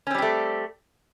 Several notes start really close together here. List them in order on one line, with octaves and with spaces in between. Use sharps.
C#4 C4 G3 G4 A3